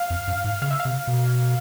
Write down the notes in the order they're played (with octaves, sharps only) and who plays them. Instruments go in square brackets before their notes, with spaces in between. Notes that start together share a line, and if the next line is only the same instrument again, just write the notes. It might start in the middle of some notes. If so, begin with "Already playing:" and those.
Already playing: [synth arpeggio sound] F5
[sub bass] F2
F#2
G#2
[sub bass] C#3 [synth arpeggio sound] F5
[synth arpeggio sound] E5
F5
[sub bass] C3
B2